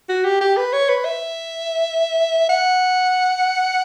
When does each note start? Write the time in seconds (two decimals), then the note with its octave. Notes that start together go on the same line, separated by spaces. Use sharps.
0.09 F#4
0.25 G4
0.41 G4
0.57 B4
0.73 C#5
0.89 B4
1.05 E5
2.49 F#5